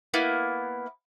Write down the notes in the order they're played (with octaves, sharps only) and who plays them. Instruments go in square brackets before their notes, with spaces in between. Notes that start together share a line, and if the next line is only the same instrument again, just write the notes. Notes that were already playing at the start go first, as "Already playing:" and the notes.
[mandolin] A#3 B3 E4